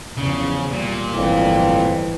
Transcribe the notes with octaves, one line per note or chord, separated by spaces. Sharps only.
E2 C#3 F3
A#2 G3
G1 F2 A2 E3